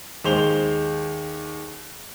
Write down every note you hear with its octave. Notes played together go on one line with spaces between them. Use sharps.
D#2 G#3 C5 F7 G7